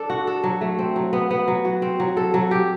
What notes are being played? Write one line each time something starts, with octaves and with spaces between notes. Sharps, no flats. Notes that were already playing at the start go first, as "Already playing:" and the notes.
Already playing: D4 A4
F#4
A4
F#3
A3
C4
F#3
B3
B3
F#3
F#4
C4
F#3
A4
F#3
G4